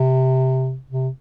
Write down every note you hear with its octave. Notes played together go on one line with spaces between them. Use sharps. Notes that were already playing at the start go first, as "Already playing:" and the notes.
Already playing: C3
C3